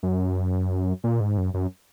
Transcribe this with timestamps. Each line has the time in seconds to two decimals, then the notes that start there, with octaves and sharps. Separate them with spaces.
0.03 F#2
1.04 A#2
1.20 G#2
1.38 F#2
1.54 F#2